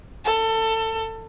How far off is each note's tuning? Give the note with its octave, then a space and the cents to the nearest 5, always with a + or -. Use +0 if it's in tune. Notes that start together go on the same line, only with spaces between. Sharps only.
A4 +25